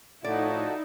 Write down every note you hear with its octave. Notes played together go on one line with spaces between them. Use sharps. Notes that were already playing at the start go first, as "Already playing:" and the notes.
A2 F3 D#4 E4 F#4 A4 D5